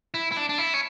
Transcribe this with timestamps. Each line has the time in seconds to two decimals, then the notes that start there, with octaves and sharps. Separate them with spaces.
0.14 E4
0.32 E4
0.37 D4
0.49 D4
0.58 E4
0.74 C#4